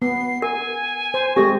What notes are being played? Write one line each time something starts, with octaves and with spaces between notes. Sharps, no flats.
B3 C7
A#4 G#5
C5
G#3 C4 G4 A4 C5 A#6